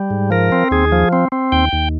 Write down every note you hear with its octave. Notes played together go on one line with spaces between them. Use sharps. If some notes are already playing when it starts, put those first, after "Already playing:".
Already playing: G3
G#2
F3 A#4
C4
D#2 G#4
F3
C4
C4
D#2 G5
D#2